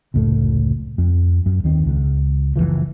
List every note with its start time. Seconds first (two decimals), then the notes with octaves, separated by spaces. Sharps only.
0.14 F1 C#2 A2 A3
0.98 F2
1.46 F#2
1.64 D#2 D#3 C4
1.86 C#2
2.56 F#1 E2 E3 F3